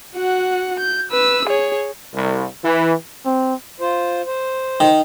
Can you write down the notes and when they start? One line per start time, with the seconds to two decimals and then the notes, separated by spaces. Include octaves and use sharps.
0.16 F#4 F#5
0.80 G6
1.12 B4 E6
1.48 G#4 C#5
2.14 C2
2.63 E3
3.26 C4
3.80 F4 C5
4.25 C5
4.80 D#3